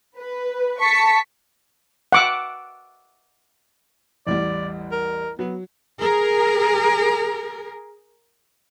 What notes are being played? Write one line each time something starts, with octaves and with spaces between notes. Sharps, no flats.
B4
A5 C#6 B6 C#7
F#5 D6 E6
A1 E2 G3 D5
A#4
F#3 B3
G#4 A#4